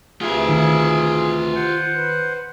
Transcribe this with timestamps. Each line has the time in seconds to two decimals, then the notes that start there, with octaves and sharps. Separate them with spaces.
0.21 D2 C3 E3 F4 G#4 E5
0.49 D#3
1.55 C5 F#5
1.96 B4